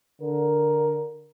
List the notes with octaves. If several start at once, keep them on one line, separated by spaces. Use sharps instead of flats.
D3 A#4